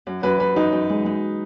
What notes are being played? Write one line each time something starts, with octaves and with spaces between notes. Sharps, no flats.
F#2
F#2 B4
F#2 B4
F#2 D#4
F#2
G#3
G#3